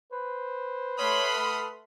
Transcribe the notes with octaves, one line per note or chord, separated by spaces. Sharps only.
B4 C5
A3 C#5 F#5 B5 C6 D#6 F6
A4